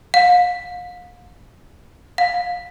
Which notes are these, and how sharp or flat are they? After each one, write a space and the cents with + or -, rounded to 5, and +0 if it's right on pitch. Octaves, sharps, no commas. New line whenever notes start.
F5 +40
F5 +25